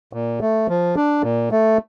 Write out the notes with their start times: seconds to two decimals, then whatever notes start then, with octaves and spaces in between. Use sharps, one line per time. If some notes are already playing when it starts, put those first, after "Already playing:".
0.13 A#2
0.41 A3
0.69 F3
0.96 D4
1.23 A#2
1.52 A3